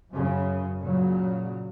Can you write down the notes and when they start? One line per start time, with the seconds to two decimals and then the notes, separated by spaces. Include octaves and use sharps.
0.12 F#2 C#3
0.82 A#2 C#3 F#3